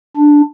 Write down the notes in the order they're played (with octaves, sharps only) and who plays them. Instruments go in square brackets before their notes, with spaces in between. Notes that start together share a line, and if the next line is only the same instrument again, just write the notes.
[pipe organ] D4